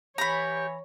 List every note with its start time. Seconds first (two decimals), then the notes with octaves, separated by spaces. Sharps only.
0.18 E3 G4 C#5 A#5 B5